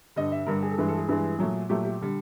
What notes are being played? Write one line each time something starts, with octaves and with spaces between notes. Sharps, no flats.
G2 D3 G3 D#5
E5
G2 D3 G3 A#4
G#4
A4
G2 E3 G#3 G#4
A4
G#4
G2 E3 G#3
A#2 F#3 A3
A#2 F#3 A3 G4
G4
D3 G3